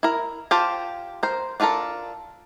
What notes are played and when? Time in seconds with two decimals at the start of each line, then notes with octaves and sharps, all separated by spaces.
0.03 E4 A#4
0.51 F4 G4 C5 A5
1.23 A#4 C5
1.60 D4 F4 F#4 A4 A#4